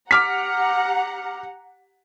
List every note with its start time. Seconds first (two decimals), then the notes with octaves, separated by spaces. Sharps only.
0.11 G4 F#5 A#5 D6 F6 B6